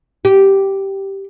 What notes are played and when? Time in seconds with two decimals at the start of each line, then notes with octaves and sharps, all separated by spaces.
0.25 G4